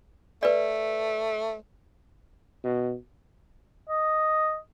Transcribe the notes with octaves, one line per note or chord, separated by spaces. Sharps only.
A3 B4 D5
B2
D#5